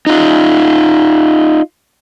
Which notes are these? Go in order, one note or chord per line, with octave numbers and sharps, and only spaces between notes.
D#4 F4